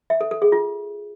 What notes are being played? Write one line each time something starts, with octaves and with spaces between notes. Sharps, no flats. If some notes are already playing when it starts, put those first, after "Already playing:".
E5
A4
A4
G#4
F4